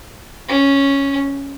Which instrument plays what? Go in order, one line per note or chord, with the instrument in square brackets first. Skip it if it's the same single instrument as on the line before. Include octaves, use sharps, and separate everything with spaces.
[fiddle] C#4